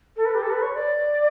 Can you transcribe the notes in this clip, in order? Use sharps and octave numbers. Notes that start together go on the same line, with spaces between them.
A4
B4
G4
A4
B4
C#5
D5